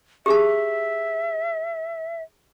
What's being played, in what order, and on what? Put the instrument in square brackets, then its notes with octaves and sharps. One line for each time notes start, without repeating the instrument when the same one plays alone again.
[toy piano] G4 G#4 A5 [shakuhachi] E5